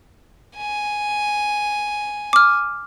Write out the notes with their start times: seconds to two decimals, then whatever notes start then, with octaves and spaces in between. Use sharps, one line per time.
0.56 G#5
2.33 D6 F6